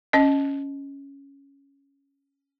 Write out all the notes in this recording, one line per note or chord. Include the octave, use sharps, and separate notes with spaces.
C#4 D#5